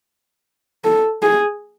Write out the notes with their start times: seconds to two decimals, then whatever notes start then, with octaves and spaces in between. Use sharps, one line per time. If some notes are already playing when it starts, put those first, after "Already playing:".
0.84 A4
1.22 G#4